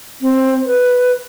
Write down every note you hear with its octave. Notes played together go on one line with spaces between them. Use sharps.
C4
B4